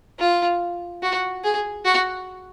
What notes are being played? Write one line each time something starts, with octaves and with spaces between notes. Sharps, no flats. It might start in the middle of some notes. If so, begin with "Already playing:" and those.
F4
F#4
G#4
F#4